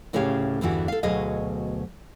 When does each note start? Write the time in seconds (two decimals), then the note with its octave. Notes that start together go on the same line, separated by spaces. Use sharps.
0.13 D2 A2 C#3 G4 C#5 F5
0.61 E2 G2 D3 E3 F#4
0.88 A4 F5
1.03 D2 B2 F#3 G#4 D#5 F5